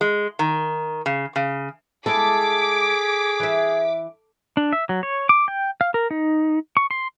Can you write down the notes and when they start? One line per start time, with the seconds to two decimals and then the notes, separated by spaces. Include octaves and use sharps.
0.01 G#3
0.39 D#3
1.06 C#3
1.36 C#3
2.06 G#3 E4 G#4 A4 D6 B6
3.40 E3 E5
4.57 D4
4.73 E5
4.89 F#3
5.03 C#5
5.29 D6
5.48 G5
5.81 F5
5.94 A#4
6.11 D#4
6.77 C#6
6.91 C6